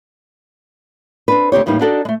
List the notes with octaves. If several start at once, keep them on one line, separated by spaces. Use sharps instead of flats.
C4 D4 B4
D2 C4 G4 C#5
E2 A2 G3 A#3 D4 D#4
D4 D#4 F#4 A4 D5 D#5
G#3 A3